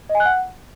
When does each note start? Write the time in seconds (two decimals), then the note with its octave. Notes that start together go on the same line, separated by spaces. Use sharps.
0.09 D#5
0.15 G#5
0.20 F#6
0.25 F#5